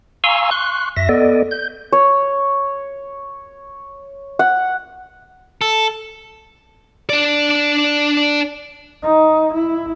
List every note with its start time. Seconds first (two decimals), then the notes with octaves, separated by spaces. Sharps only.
0.24 F5 G#5 A#5 C6 C#6 E6
0.51 C6 C#6 F#6
0.97 F#2 E5 A#6
1.09 B3 A4 D5 D#5
1.51 G6
1.92 C#5
4.39 F#5
5.61 A4
7.10 D4 D5
9.03 D#4
9.54 E4